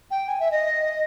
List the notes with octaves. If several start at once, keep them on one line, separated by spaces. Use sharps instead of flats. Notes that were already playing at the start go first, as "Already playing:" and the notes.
G5
G#5
E5
D#5